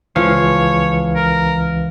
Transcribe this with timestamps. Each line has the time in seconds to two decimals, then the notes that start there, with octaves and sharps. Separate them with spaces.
0.16 C#2 E3 F3 C#5 F5
1.15 A#4